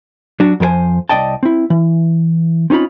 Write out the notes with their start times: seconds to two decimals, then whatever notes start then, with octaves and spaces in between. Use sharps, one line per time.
0.40 F#3 D4 F#4
0.60 F2 F3 A#4 C5 G#5
1.09 C2 C3 D5 D#5 G5 A5
1.43 C4 E4
1.70 E3
2.70 C4 C#4 D#4 F4 B5